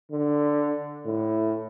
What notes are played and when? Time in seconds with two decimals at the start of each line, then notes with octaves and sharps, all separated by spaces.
0.11 D3
1.06 A2